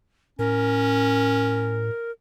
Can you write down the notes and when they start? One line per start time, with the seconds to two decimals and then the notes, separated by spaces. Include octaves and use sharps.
0.39 A2 C#4 A#4